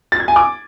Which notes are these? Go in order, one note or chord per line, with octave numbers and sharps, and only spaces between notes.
A6
G#6
G#5
D6